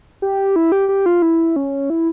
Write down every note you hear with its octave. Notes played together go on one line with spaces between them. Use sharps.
G4
E4
G4
G4
F4
E4
C#4
E4